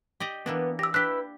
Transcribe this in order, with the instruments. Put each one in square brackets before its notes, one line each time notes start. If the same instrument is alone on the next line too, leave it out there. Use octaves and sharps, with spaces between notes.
[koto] G4 D5 D#5
[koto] E3 A#3 D4 [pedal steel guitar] B3
[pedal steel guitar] G4 [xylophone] E6 A#6
[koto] D4 G4 [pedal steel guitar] E4 B4 E6 [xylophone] F#6 B6